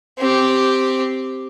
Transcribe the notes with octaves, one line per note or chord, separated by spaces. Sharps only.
C4 G4